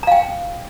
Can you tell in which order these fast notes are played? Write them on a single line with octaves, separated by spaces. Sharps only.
A#5 F5 G5